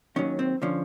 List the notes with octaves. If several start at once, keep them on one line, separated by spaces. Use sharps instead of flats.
D#2 D#3 F#3 C#4
C4
D3 F3 C#4